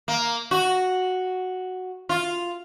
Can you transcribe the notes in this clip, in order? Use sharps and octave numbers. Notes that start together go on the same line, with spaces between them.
A#3
F#4
F4